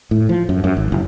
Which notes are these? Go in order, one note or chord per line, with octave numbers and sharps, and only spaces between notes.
A2
F3
F#2
F#2
G#1
F#1